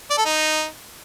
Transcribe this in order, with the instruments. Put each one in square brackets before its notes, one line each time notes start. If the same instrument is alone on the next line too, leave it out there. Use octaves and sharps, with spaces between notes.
[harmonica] D5
A4
D#4